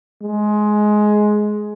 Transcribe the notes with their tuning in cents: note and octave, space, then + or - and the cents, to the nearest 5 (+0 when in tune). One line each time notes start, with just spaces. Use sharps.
G#3 +15